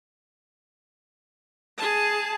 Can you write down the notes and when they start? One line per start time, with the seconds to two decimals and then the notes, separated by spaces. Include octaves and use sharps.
1.78 G#4 A5